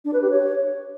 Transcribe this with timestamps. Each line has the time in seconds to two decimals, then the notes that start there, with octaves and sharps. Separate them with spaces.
0.05 D4
0.13 B4
0.22 G4
0.30 C#5